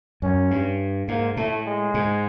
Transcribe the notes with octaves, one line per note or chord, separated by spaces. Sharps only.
F#2 C#4
G2
G#2 A#3
A2 A3
G#3
G#2